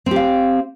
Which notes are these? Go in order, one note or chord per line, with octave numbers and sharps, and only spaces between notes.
C4 G4 F5